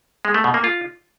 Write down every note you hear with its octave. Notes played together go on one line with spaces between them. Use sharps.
G#3
A3
B2
A#3
F4